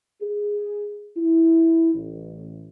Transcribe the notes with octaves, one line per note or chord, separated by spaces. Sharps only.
G#4
E4
A1